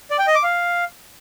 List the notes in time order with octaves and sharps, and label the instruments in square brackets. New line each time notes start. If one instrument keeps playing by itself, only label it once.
[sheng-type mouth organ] D5
G5
D#5
D6
F5